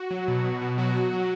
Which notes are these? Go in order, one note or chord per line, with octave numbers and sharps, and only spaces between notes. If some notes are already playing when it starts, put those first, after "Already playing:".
Already playing: F#4
F#3
B2
B2
B2
F#3 F#4
F#3
F#3